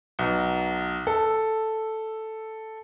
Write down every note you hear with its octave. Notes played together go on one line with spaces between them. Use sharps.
B1
A4